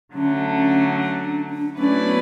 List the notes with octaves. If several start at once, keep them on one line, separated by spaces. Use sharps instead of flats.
D3 F#3 A3 C#4
C#4
D4
D4
F#3 A3 C#4 E4 B4 D5
B3